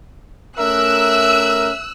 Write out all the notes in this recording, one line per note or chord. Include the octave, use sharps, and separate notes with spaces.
A3 C#4 A#4 E5 E6 F#6